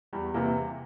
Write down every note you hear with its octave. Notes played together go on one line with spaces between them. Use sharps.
E2 G3
C3 E3 A#3